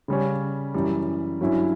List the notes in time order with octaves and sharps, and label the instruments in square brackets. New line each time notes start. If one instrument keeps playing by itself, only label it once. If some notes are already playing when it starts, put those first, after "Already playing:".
[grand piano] C#3 G3 C#4
F#2 E3 G3
G2 F#3 C#4 E4